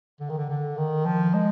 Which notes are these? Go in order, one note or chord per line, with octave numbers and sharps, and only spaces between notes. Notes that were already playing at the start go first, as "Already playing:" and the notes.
D3
D#3
D3
D3
D#3
F3
G#3